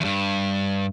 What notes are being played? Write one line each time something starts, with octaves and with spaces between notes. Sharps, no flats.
E2 G2